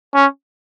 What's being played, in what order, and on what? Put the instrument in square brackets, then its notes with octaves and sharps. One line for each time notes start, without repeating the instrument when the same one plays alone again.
[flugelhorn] C#4